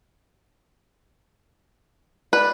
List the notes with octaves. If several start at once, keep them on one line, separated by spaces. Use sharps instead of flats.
B4 D5